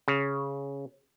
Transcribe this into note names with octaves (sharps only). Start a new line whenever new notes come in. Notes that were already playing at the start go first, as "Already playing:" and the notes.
C#3